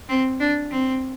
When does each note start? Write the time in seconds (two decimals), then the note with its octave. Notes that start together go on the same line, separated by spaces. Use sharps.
0.09 C4
0.40 D4
0.71 C4